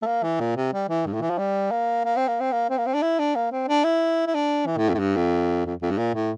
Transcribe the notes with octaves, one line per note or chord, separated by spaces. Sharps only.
A3
A#3
E3
A#2
C3
G3
E3
G2
A2
E3
F3
G3
A#3
A#3
C4
A#3
C4
A#3
C4
A#3
C4
D4
E4
D4
A#3
C4
D4
E4
E4
D4
E3
A2
F2
A2
G2
F2
F2
F2
G2
A#2
A2